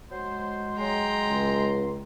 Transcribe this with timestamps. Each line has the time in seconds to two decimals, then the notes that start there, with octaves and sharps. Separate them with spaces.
0.11 F#3 G#3 C5
0.79 F#3 G#3 G5 A#5 C6
1.28 C#2